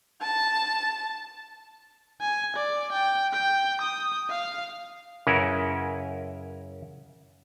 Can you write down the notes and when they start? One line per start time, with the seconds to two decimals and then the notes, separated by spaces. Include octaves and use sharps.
0.22 A5
2.21 G#5
2.56 D5
2.93 G5
3.33 G5
3.81 D#6
4.30 F5
5.27 F#2 C#3 C#4 E4 A#4 B4